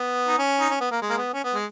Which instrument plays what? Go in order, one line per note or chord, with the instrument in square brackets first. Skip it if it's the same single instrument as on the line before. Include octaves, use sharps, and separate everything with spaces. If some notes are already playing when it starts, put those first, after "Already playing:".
Already playing: [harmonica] B3
D#4
C#4
D#4
C#4
B3
A#3
G#3
A#3
B3
C#4
B3
G#3